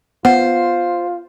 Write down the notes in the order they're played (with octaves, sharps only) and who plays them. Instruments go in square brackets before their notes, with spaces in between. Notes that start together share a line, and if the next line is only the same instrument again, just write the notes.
[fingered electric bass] B3 [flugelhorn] F4 [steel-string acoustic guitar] C5 [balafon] F#5